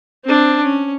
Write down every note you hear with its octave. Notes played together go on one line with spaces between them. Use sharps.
C4 D4
C#4